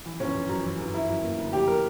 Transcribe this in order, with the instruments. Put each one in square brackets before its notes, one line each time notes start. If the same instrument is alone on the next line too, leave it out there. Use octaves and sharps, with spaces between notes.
[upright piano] E3
[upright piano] G1 [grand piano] C#4
[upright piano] G1
F#2
E3
G1
[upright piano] G1 [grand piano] E4
[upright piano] F#2
A#3
D2
[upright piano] D2 [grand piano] G4
[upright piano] D3 [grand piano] A#4